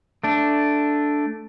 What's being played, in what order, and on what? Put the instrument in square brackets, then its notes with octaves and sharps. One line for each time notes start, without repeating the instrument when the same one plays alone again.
[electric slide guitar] A3 D4